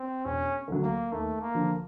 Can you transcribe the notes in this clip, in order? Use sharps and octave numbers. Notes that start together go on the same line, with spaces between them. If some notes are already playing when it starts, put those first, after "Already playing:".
Already playing: C4
E1 C#4
D2 D3 F#3
A#3
D#2 A3
A#3
D3 F3